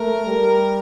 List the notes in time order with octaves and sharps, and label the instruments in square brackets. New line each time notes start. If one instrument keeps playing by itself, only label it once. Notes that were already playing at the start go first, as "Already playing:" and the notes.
Already playing: [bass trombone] A3 [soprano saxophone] A#4
[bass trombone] G3